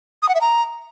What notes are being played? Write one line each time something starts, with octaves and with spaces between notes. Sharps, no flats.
D#6
F#5
E5
A#5